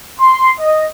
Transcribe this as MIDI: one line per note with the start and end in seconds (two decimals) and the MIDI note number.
0.19 0.51 84
0.58 0.83 75